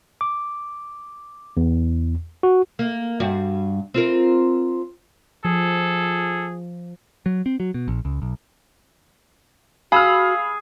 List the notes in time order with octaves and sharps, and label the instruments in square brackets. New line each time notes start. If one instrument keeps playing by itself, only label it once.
[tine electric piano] D6
E2
F#4
[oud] A#3
G2 F#4
C4 F4 A#4
[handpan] F3 [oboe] G#4 [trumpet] A4
[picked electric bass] F#3
C4
F#3
B2
A#1
C#2
B1
[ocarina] F#4 [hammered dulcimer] G#4 [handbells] F5 [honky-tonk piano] B5 E6 F6